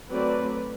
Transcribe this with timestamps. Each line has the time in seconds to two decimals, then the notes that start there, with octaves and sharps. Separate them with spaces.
0.10 F#3 A3 C4 B4 D5